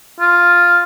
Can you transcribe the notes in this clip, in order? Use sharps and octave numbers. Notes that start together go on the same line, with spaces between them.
F4